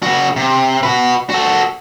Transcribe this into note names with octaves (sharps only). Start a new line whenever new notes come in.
C#3 F#4
C3
F#4 B4
F#4 A4